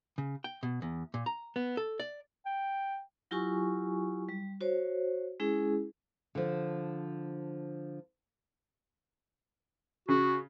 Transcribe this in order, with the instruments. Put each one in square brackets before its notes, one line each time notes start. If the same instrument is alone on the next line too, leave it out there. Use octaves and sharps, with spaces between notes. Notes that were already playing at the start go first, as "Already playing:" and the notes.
[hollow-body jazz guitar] C#3
G5
B2
E2
A#2
A#5
B3
A4
D5
[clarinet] G5
[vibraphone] F#3 E4 F4 G4 G#5 C#6
G3
F#4 C5 C#5
G#3 C#4 E4 G#4
[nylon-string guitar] D3 F3
[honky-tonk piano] C#3 [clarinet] F#4